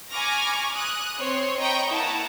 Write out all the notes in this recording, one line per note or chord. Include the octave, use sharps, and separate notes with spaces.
G#5 B5 C#6 D6 F6 A#6
D#6 F#6
C4 C#5 C6
D#5 G5 A#5 B5 C#6
A#3 E4 F#5 A5 A#5